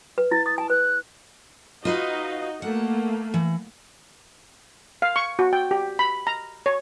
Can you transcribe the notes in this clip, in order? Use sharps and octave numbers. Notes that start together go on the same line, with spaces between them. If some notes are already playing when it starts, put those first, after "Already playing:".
B4
E4 A6
D#6 A6
G#5 A5
B4 F#6
D#4 F4 F#4 B4 D#5 F5
A3 A#3 F#5
E3
F5
C#6
F#4
G5
G4
B5
A#5
C#5